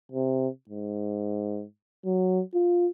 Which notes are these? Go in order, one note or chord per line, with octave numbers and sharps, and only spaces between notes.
C3
G#2
F#3
F4